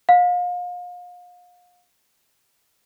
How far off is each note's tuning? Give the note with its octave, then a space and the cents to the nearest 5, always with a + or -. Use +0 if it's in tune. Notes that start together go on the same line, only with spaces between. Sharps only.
F5 +35